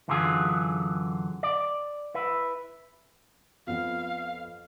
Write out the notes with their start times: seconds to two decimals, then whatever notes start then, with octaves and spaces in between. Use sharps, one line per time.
0.08 F#2 D3 E3 F#3 F4 G#4
1.43 D5
2.14 E4 B4
3.67 F2 B3 F5